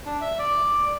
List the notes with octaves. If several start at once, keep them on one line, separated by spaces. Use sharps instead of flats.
D4
E5
D5